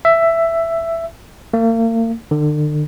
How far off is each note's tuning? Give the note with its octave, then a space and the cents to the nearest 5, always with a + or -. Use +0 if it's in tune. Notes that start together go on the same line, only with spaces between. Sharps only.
E5 +10
A#3 -40
D3 +40